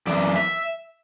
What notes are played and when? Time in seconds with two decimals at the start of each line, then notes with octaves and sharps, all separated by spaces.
0.07 F#2 E3 D5
0.36 E5